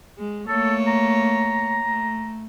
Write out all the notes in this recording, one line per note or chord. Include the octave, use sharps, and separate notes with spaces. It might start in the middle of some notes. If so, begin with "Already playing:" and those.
G#3
A3 A#3 A4 C#5
A#5
A3